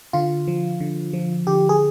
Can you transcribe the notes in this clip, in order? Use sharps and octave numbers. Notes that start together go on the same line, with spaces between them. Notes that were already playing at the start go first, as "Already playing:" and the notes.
D3 F4
F3
D3
F3
D3 G4
G#4